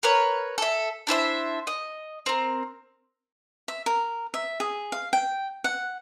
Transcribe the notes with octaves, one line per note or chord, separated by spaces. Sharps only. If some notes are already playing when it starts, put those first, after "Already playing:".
A#4 B4 C#5
A4 E5
D4 E4 C5 E5
D#5
C4 A#4
E5
A#4
E5
G#4
F5
G5
F#5